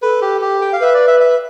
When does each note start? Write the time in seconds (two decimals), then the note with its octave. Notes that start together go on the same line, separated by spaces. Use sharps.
0.02 A4 B4
0.21 G4
0.41 G4
0.61 G5
0.73 F5
0.80 B4 E5
0.94 D5
1.07 E5
1.20 E5